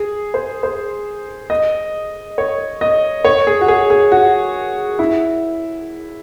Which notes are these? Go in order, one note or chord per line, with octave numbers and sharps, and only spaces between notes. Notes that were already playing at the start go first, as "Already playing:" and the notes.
Already playing: G#4
C5
C5
D#5
C#5
D#5
C#5
G#4
F#4
G#4
G#4
F#4
E4